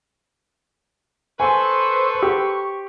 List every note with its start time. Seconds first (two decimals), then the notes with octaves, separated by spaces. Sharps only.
1.40 A4 B4 C5 G#5 C#6
2.23 G4